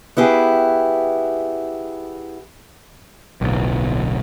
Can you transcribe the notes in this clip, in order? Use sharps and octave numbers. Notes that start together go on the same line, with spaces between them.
B3 E4 G4 G#4
D1 B1